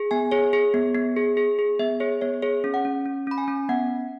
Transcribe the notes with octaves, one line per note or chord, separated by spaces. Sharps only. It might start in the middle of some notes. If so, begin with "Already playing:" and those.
Already playing: G#4
B3 G#5
G#4 C#5
G#4
B3
B3
G#4
G#4
G#4
B3 E5
G#4 C#5
B3 C#5
G#4 C#5
C#4
F#5
C#4
C#4
C#4 B5
G#5
C#4
B3 F#5